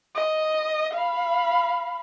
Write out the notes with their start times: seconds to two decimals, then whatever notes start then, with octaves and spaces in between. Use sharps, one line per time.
0.15 D#5
0.93 F5 B5